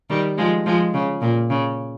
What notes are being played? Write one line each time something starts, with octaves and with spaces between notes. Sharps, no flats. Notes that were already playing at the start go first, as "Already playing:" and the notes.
D#3 G3
F3 G#3
F3 G#3
C#3
A#2
C#3